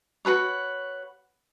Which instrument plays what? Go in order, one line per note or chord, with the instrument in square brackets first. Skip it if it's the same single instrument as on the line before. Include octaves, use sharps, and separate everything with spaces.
[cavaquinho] F#4 G#4 B4 C#5